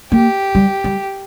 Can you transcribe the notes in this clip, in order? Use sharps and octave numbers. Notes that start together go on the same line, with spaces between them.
A#3 G4
G3
G3